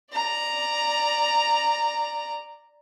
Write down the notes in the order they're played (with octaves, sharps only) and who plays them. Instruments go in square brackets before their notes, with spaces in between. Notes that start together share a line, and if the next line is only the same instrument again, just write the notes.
[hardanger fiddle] D5 A#5